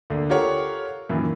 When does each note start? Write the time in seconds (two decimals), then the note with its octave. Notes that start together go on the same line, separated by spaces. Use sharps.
0.10 D2 D3 A#3
0.29 F4 G4 A4 A#4 C#5 F#5
1.09 F#2 A#2 D#3 E3 A#3